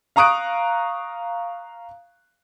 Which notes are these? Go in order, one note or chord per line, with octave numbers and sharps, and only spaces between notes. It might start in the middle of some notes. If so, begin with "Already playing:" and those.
F5 A#5 C#6 D#6 F#6 D7